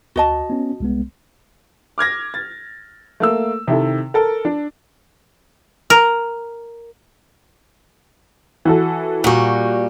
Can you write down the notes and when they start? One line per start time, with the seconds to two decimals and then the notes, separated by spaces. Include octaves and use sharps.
0.16 D2 F#4 D#5 A5
0.50 B3 C#4
0.80 C2 G#3 B3
1.98 D6 F6 G#6 A#6
2.34 A6
3.20 A3 A#3 E6
3.68 C3 D#3 E4 A4
4.14 A4 A#4
4.45 D4
5.90 A#4
8.65 E3 F#4 A4
9.24 A#2 G3 F#4 C#6